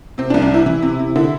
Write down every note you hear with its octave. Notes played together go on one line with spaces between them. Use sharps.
C3 C4
D4
C2
D4
C3 E4
E3
C3
C3
D3 E4